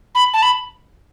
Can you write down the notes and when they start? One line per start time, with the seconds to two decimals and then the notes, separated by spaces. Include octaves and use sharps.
0.15 B5
0.34 A5
0.42 B5